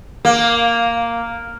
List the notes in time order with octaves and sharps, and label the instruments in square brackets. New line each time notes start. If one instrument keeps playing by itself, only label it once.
[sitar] A#3